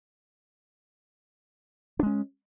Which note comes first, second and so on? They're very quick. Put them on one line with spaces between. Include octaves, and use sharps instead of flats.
D4 G#3 C#4